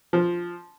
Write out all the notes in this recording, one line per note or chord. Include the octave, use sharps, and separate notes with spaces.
F3